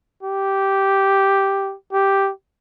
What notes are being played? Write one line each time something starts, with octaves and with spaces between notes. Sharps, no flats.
G4
G4